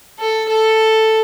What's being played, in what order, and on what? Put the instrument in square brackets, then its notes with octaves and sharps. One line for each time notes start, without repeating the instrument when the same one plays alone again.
[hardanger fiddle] A4
A4